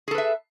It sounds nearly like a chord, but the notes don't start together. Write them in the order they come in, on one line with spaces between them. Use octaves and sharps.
G#4 A4 B4 E5